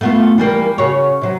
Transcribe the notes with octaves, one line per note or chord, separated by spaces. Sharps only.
A3 B3 F4
E3 G3 A#3
C#3 F#4 C#5
C3 F#3